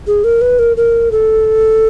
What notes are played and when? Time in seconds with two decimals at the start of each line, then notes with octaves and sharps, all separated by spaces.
0.07 G#4
0.24 A#4
0.41 B4
0.59 A#4
0.77 A#4
1.12 A4